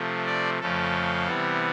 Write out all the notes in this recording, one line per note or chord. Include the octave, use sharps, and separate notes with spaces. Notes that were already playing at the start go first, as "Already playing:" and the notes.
Already playing: C3 F3 A3
D5
F2 C#3 F3 A3 A4
C3 E3 G3 B3